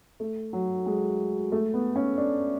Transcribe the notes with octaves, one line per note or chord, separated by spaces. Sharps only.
A3
F#3
G#3
A3
B3
C#4
D4